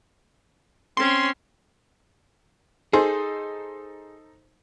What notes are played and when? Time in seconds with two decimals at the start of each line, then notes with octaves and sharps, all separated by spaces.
0.97 C4 C#4 C6
2.93 D#4 G#4 A4 C5